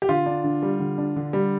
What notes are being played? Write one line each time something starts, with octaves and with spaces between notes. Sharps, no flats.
G4
D3 F4
D4
D3
G3
D3
D4
D3
G3